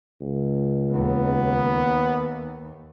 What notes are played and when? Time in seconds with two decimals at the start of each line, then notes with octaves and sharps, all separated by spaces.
0.21 C#2
0.91 D#2 B3